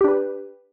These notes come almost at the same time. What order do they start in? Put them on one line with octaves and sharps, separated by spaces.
G4 D4 B4